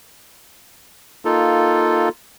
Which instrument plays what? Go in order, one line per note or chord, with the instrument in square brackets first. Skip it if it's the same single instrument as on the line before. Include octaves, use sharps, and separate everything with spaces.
[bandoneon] A#3 D#4 F4 A4